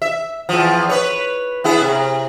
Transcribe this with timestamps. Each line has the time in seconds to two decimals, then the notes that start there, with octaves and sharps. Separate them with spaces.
0.02 E5
0.49 E2 F3
0.89 B4 C#5
1.64 B3 E4 G#4
1.81 C3